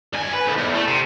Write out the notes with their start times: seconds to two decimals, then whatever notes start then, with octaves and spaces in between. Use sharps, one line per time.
0.13 G2 G#5
0.33 B4
0.46 B1 F2
0.58 E2
0.74 A3
0.88 C3